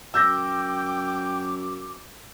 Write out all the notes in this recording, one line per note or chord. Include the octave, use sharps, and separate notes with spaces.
F#2 G5 D6 E6 G6 A#6